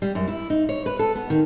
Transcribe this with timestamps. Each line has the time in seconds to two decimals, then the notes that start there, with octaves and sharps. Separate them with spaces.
0.02 G3
0.15 F#2
0.28 E4
0.50 D#4
0.69 C#5
0.86 B4
0.99 A4
1.15 B3
1.30 D#3